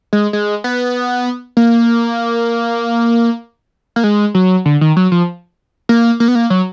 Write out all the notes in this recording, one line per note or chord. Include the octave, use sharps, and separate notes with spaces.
G#3
G#3
B3
A#3
A#3
G#3
F#3
D3
D#3
F#3
F3
A#3
A#3
B3
A#3
F#3